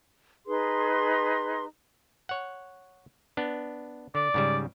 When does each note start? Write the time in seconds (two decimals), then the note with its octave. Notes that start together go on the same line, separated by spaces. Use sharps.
0.47 D#4 G#4 B4 C6
2.29 C#5 F#5
3.37 B3 D4
4.15 D3 D5
4.34 G#2 C#3 G3